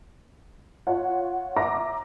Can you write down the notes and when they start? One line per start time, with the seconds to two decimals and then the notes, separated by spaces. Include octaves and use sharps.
0.87 F4 C#5 F#5
1.56 E5 A#5 D6 A#6